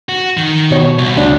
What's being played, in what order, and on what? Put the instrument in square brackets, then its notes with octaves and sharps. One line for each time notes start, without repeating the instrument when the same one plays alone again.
[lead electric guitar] F#4
D#3
[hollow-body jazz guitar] B2 C#5
[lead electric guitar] C2
[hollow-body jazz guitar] D2 D4